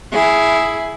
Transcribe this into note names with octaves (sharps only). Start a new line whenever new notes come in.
E4 G#4